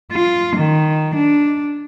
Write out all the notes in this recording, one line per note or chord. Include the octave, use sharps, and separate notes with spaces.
F4
D#3
D4